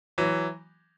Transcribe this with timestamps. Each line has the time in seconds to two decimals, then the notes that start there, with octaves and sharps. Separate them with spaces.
0.18 E3 F#3